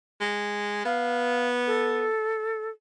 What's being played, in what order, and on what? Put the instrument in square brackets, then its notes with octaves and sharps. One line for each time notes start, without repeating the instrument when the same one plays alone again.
[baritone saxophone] G#3
[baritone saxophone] B3 [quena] F5
[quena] A4